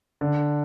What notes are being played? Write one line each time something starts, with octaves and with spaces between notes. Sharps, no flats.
D3